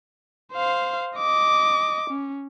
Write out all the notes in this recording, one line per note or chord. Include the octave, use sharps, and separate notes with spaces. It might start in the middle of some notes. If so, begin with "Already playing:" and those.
C5 F5
D#5 D6
C#4